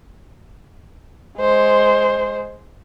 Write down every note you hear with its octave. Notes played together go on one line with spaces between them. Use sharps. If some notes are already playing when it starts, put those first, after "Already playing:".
G#3 C5